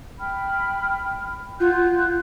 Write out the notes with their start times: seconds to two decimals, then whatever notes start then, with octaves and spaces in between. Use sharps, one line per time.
0.20 G5 B5 F6
1.60 F4 F#5 F#6 G6